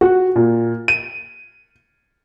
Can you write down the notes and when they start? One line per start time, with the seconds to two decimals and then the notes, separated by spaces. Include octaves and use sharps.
0.01 F#4
0.36 A#2
0.88 D#7